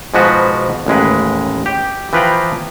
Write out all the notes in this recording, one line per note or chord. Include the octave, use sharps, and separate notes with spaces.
G#2 B2 F3 G#3 F#4 B4
A1 D#2 G#3 B4
G4
E3 F3 B4 F5 G5 A#5